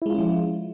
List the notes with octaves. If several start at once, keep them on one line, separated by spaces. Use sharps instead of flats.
F3 G#3 C#4 E4 F4